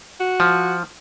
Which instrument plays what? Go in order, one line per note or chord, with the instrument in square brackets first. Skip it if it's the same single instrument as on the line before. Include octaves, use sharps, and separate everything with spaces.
[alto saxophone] F#4
[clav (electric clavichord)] F3